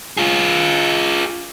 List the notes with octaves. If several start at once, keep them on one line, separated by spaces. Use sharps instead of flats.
F4 G#4